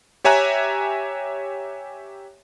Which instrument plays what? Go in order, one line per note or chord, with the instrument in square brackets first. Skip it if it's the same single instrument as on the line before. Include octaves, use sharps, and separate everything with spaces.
[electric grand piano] G4 C#5 E5 G#5 A#5 F#6